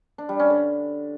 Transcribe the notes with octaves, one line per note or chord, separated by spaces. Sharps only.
D4
G3
C#4
D3